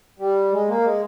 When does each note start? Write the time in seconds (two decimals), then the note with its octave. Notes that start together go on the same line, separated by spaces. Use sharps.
0.19 G3
0.52 G#3
0.68 A#3
0.84 G#3